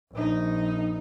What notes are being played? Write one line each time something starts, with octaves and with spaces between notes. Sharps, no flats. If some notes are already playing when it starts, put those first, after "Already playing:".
A#1 D#4